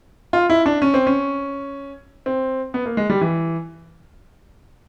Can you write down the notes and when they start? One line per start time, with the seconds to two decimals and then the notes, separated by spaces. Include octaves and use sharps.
0.33 F4
0.50 E4
0.66 D4
0.82 C#4
0.94 C4
1.07 C#4
2.26 C4
2.74 B3
2.86 A#3
2.97 G#3
3.10 G3
3.21 E3